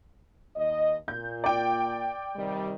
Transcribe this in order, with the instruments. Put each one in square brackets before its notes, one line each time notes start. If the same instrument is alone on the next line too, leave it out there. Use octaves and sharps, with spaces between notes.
[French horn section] D#2 D#5
[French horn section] A#2 [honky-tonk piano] G6
[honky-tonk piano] D5 G5
[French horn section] C3 D#3 G3